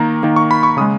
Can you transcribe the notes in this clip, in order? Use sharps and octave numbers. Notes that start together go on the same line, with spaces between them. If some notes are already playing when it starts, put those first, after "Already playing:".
Already playing: D#3 A#3 A#5
D#3 A#3
C#6
B5
C#6
C#3 G#3 D#6